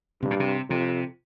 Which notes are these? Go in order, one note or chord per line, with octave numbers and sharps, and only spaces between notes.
G2 C3
A#2
C3
F2 C3